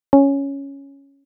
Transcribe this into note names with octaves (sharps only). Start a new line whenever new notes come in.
C#4